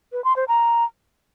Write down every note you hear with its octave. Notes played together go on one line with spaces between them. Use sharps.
B4
C6
C5
A#5